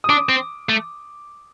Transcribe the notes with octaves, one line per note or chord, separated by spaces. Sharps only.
D#6
D4 D6
C4
A3